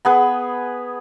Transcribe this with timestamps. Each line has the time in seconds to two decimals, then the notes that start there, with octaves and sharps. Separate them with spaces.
0.05 B3 G#4 B4